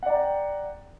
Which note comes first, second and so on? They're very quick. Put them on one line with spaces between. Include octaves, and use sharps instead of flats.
F#5 D5 A#5 G5